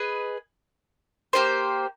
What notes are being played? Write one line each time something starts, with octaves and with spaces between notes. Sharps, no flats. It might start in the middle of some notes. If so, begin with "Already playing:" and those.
Already playing: G#4 B4 D#5
A#3 D#4 G4 C5